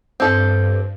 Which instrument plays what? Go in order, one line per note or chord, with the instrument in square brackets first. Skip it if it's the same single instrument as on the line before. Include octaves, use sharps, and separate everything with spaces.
[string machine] G2 [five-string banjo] C4 A4